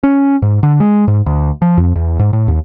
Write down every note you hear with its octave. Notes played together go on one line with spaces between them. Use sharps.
C#4
G#2
D3
G#3
G#2
D2
F3
F2
E2
G#2
A2
D#2